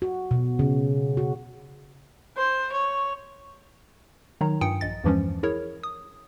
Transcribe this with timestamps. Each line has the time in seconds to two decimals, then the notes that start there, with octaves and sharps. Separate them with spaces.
0.02 F#4
0.31 B2
0.59 C#3
1.17 F#4
2.37 C5
2.72 C#5
4.41 D#3 F#3 D#4 C#5 A#5
4.61 G2 F4 G5 G#5 D#6 C#7
4.81 A#1 D#5 A6
5.04 E2 G2 E3 F3 G#3 C#4
5.43 E4 G#4 A#4 C#5
5.83 D#6